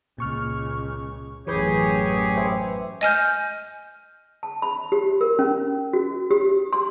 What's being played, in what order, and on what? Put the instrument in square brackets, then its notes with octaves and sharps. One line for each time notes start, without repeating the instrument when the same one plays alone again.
[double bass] C#2 [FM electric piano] A#2 C#6 F6
[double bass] A1 F#2 [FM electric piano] E3 B4 G6 [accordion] G4 G#4 C#5
[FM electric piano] B4 C5 E5
[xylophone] D#5 G#5 F6 G6
[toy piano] A5
B5
G4
A#4
C#4
F#4
G4
C6